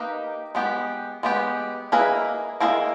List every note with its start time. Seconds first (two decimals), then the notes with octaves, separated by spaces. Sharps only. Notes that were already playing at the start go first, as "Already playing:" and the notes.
Already playing: A#3 D#4 G4 B4 D#5
0.55 G#3 B3 G4
1.23 G#3 B3 G4
1.92 A#3 E4 G#4 B4 D#5
2.60 A#3 E4 G#4 B4 D#5